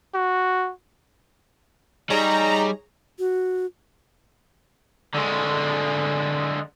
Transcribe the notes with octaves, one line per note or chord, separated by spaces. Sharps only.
F#4
G3 D#4 G#4 C#5 A#5
F#4
D3 G#3